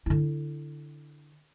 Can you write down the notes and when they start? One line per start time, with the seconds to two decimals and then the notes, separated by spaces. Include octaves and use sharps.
0.06 D3 E4